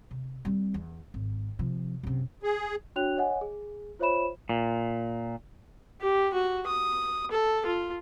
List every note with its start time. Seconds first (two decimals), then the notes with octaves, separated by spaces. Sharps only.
0.11 C3
0.45 G3 C4
0.74 E2
1.14 G#1
1.59 C3 F3
2.03 F#2 C3
2.43 G#4
2.96 D4 F#4 C#5 G5 F#6 F7
3.17 C#5 D#5 F#5 G#5
3.41 G#4
3.99 F4 C5 C#5 E5 B5 E7
4.49 A#2
6.01 G4
6.34 F#4
6.67 D#6
7.31 A4
7.66 F4